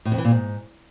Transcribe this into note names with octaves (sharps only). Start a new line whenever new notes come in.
A2
F2
E3
A#2
G#2